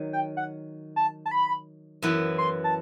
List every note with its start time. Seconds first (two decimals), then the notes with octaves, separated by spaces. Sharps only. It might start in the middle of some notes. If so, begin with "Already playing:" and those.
Already playing: D#3 F#3
0.13 G5
0.37 F#5
0.96 A5
1.26 A5
1.31 B5
2.02 F#2 E3 B3 E4 B4
2.38 C6
2.64 A5